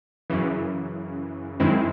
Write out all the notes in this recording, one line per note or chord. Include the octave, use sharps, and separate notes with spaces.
F#2 C#3 E3
F#2 D#3 G#3 C4 E4